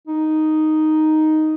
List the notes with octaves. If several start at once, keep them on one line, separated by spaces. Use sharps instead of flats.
D#4